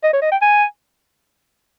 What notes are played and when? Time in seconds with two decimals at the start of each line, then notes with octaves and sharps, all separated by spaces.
0.03 D#5
0.13 C#5
0.22 D#5
0.32 G5
0.41 G#5